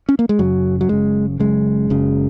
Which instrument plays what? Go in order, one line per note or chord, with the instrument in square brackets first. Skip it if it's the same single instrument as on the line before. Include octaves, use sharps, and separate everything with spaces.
[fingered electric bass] C#4
A#3
G#3
F#1 F#2 C#3 F#3
F#3
F#1 F#2 C#3 G#3
F#1 F#2 C#3 G#3
F#1 F#2 C#3